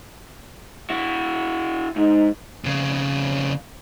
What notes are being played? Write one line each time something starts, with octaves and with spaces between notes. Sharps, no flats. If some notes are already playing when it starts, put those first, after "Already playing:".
E4 F#4
G#2 D#4
F2 C#3